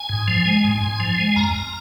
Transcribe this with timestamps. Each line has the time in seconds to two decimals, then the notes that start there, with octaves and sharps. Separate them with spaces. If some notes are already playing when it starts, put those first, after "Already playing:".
Already playing: G#5
0.09 G#2
0.28 F3
0.46 G#3
0.64 G#2
0.82 G#2
1.00 F3
1.18 G#3
1.36 F2 A#5
1.54 F2